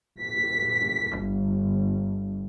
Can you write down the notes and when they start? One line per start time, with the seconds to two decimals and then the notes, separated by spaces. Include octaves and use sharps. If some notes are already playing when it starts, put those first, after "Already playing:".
0.20 B6
1.19 G1